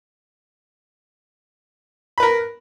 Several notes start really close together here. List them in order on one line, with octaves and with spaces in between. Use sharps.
B5 B4 A#4